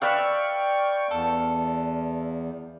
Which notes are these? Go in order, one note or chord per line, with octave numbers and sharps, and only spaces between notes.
B4 D5 E5 F5 G5 C#6 E6 F#6
E2 A4